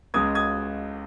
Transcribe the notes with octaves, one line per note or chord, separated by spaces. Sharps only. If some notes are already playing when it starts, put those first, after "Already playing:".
C#2 C#3 G#3 D#6 G#6
D#6 G#6